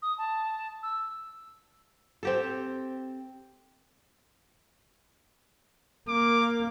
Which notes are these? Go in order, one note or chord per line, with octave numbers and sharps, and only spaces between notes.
D#6
A5
E6
C4 G4 A4
A#3 D6